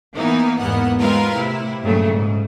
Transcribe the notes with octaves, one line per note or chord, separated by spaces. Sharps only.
E3 A#3 B3 D#4
E2 G#2 A#3 B3 F#5
G#3 C4 F4 A#4 B4 F5
A2 C3 E4
G2 A#2 C#3 F#3 A3
G#2